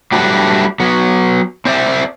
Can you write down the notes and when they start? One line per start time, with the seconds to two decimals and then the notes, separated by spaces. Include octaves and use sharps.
0.12 F#3 G3 A3 D4 F#4 B4
0.80 F#3 B3
1.65 C4 C5 D5 E5